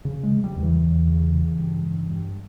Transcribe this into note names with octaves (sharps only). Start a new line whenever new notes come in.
C#3
G#3
C#3
G3
E2
E3
E2
C#3
C#3
G2
G2
G2